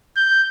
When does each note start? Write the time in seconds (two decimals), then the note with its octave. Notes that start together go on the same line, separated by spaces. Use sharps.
0.16 G6